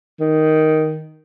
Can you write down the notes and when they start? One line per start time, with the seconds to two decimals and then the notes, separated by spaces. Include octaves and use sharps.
0.20 D#3